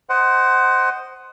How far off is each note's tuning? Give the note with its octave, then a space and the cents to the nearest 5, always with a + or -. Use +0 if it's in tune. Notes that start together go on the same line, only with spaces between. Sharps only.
C5 +0 D#5 +0 F#5 +20